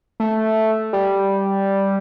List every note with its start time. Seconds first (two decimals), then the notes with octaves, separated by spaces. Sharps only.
0.20 A3
0.93 G3